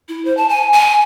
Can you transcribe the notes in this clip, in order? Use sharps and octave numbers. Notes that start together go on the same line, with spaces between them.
E4
C5
A5
G#5
G#5